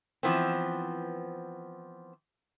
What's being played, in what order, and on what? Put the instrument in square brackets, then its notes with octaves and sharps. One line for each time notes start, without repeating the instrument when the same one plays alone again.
[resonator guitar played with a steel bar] E3 F3 B3 C4